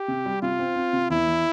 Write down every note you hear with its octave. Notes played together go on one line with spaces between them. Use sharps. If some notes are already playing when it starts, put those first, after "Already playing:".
Already playing: G4
C3
G3
C3 F4
C4
C4
C3
E2 E4
E2